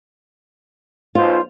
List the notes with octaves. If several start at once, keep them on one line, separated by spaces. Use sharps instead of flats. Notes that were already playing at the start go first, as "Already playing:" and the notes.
B1 F4 C5